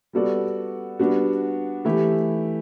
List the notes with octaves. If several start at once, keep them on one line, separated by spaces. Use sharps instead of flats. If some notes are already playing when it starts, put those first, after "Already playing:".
G3 B3 F#4 A4 D5
G3 B3 D4 F#4
E3 A3 E4 G4